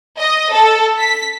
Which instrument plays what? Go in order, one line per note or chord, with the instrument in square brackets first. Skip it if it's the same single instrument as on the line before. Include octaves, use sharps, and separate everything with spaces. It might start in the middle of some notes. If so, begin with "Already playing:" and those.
[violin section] D#5
A4
B6